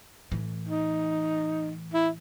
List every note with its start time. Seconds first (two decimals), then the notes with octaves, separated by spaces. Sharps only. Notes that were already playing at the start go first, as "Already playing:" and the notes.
0.32 A2 E3
0.68 D#4
1.94 E4